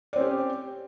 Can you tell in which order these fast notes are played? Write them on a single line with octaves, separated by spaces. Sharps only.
D5 C4 C#4 G4